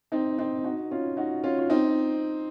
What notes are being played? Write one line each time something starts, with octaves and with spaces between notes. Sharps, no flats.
C4 D#4
C4 D#4
D#4 F#4
C#4 F4
D#4 F#4
C#4 F4
F4
C4 D#4